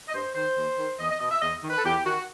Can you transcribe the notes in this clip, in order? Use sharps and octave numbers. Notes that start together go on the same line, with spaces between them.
D#5
G2 C5
D#3 C5
D#2
D#3
E2 D#5
D#5
B2 D#5
E5
E2 D#5
D#3
B4
A4
E2 G4
D#3 F#4